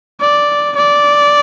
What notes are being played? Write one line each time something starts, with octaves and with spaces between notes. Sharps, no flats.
D5
D5